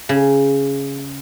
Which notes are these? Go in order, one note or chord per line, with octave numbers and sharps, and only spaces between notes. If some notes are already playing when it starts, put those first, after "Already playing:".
C#3